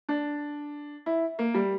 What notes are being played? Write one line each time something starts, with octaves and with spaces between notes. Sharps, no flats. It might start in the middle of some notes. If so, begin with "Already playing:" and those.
D4
E4
A#3
G3